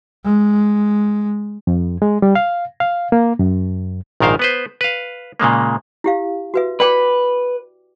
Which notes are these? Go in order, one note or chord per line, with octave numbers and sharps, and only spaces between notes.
G#3
F2
G#3
G3
F5
F5
A#3
F#2
A#1 G#2 D#3 A#4 C5 F5
B3 B4 C5
B4 F5
A#2 C#3 G#3 A#3
E4 G4 F5
F#4 B4 E5
B4 D5 G5 D6